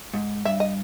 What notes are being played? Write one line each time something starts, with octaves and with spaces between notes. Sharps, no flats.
G#2
G2 E5
D#5